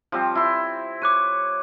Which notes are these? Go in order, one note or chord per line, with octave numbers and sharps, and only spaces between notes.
F3 G3 C4
E4 C6
C#5 D6 F#6 D#7